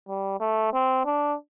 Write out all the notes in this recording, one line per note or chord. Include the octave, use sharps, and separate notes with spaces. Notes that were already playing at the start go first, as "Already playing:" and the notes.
G3
A3
C4
D4